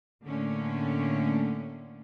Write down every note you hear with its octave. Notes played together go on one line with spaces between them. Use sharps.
A2 D3 A3 A#3 C#4